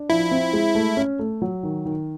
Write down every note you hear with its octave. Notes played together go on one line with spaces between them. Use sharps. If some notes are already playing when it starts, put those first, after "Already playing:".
Already playing: D4
F3 E4
C4
G#3
A3
C#4
A3
F#3
D#3
D#3